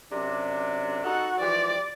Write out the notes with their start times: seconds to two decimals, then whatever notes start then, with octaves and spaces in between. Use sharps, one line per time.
0.11 F#2 C3 D4
1.04 D#4 F#4 A4 F#5
1.40 E3 F3 G4 D5